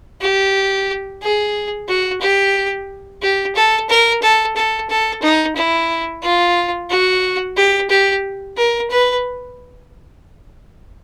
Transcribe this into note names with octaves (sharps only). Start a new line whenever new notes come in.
G4
G#4
F#4
G4
G4
A4
A#4
A4
A4
A4
D#4
E4
F4
F#4
G4
G4
A#4
B4